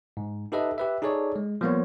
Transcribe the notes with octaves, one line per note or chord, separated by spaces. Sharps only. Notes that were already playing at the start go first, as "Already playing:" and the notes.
G#2
D#4 G4 A4 B4 D#5 E5
G4 B4 E5
D#4 G#4 A4 C#5 D5
G#3
F3 G3 A#3 B3 F4 C#5